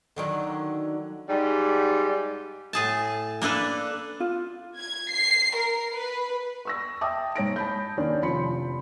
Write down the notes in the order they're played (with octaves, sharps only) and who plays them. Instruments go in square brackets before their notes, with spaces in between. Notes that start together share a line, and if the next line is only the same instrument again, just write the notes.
[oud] D3 D#3 F#3
[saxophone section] G#2 G3 D#4 G4
[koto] A2 G#4 A5
A#3 D4 A4 B4
[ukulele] F4
[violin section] G#6
C7
A#4
B4
[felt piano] C#6 E6 A#6
E5 G5 A5 D6 D#6
G#2 C#5 A#6 D7
A5 B5 G6
D#2 D#3 C#4 D4
F1 F3 B5 C6 C#7